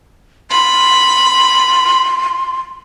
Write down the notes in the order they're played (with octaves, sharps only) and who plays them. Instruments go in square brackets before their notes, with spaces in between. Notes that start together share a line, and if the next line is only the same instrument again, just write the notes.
[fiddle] B5 [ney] C6